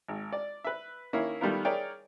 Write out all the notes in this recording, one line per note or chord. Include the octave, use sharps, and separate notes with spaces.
G#1
D5
B4 E5
D#3 A#3 C#4 E4
D#3 G3 A3 B3 F4 A#4
G#4 A#4 C#5 D5 E5 G5